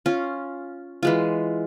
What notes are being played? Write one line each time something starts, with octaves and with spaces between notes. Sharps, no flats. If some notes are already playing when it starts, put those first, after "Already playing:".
C#4 F4
E3 G#3 F4